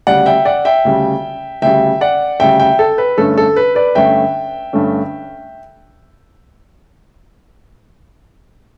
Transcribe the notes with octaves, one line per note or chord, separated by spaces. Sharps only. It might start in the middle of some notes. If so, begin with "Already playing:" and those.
D2 C#3 G3 D5 F#5
E5 G5
D5 F#5
E5 G5
D2 C#3 G3
D2 C#3 G3 E5 G5
D5 F#5
D2 C#3 G3 E5 G5
E5 G5
A4
B4
G2 D3 A3 C#4 A4
A4
B4
B4 D5
G2 D3 A3 C#4 E5 G5
G2 D3 A3 C#4